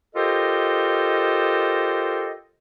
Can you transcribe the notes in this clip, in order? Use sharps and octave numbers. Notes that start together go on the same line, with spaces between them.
F4 G4 A4 A#4 C5 D#5